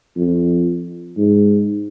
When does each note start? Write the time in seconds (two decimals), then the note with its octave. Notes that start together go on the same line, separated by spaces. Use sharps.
0.17 F2
1.18 G#2